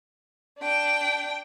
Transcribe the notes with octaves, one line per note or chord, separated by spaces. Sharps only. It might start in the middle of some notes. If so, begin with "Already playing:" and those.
D4 G5